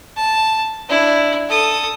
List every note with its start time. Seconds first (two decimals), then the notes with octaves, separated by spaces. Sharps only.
0.16 A5
0.88 D4 E4
1.49 A4 D#6